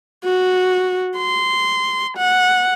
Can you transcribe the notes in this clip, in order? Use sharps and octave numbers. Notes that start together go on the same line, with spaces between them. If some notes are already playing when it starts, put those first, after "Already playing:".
F#4
C6
F#5